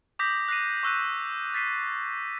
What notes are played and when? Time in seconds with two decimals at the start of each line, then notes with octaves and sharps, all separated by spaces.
0.19 D6 D#6 G6 A#6 B6
0.48 F#6 A#6 C7 D#7
0.83 C#6 E6 F#6 D#7
1.54 A6 B6 C7 D#7